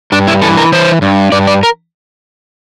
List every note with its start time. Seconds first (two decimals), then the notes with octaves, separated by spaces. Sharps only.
0.12 G2 D4
0.27 E4
0.42 E3 A4
0.57 A#4
0.72 E3 C5
1.02 G2
1.32 G2 D5
1.47 D5
1.63 A#4